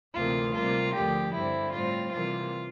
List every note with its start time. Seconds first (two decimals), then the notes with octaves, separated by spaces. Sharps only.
0.15 D2 C3 E3 A#3 F4
0.54 C3 G3 A#3 F4
0.94 D2 D3 F3 G4
1.33 G2 D3 G3 C4 E4
1.72 A2 G3 C4 F4
2.12 C3 E3 G3 A#3 F4